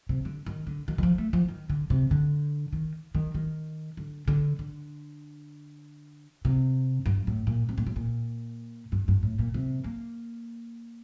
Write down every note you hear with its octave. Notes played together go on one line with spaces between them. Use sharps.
C3
D3
D#3
D3
D#3
D#3
F3
A3
F3
D#3
D3
C3
D3
D#3
D#3
D#3
D3
D3
D3
C3
G2
A2
A#2
C3
A#2
A2
A#2
G2
G2
A2
A#2
C3
A#3